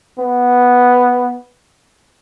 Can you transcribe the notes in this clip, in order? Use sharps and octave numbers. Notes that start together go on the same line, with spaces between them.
B3